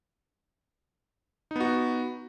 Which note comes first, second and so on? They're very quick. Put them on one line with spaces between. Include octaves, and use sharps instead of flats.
D#4 B3 F#4